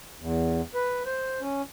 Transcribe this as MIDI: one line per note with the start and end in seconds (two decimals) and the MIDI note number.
0.20 0.61 40
0.75 1.03 71
1.06 1.40 72
1.40 1.62 61